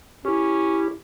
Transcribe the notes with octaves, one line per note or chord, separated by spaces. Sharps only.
C#4 E4 G4